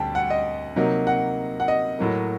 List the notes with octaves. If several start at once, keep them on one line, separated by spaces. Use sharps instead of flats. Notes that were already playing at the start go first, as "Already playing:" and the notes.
Already playing: D2 D3 G3 G5 A5
F#5
D#5
C3 F#3 A#3 D#4
F#5
F#5
D#5
A2 F#3 A#3